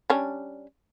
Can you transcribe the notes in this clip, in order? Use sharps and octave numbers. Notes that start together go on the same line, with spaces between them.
G3 C#4 D4